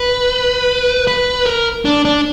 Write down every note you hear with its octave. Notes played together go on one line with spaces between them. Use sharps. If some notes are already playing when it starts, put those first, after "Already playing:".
Already playing: B4
B4
A#4
D4
D4